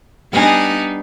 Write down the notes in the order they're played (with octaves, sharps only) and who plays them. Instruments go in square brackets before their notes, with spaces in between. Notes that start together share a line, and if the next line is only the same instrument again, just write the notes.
[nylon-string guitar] G3 G#5 [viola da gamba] B3 D4 D#4